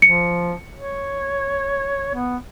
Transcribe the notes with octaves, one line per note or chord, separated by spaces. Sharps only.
F3 C#7
C#5
B3